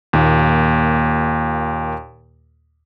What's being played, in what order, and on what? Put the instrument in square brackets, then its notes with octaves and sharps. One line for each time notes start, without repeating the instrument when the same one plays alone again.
[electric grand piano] D#2 A#2 A#3